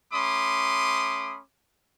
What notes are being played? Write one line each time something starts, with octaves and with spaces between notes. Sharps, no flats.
A3 C#4 B5 C6 D6 D#6